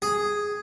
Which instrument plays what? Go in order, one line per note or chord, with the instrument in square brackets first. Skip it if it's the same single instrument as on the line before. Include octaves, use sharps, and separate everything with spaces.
[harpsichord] G#4